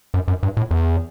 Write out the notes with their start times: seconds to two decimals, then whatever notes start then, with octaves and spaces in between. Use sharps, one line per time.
0.14 F#2
0.28 F#2
0.43 G2
0.57 A2
0.71 E2